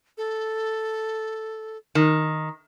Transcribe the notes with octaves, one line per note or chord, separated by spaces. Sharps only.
A4
D#3